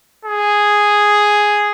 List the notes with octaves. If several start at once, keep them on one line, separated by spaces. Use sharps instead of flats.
G#4